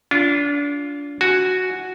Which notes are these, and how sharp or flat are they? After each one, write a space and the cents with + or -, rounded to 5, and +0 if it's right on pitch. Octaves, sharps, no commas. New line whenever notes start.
D4 -30 F4 +0
F#4 +0 G#5 +0